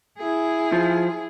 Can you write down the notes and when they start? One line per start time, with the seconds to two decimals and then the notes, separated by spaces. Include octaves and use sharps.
0.19 E4 G#4
0.72 F3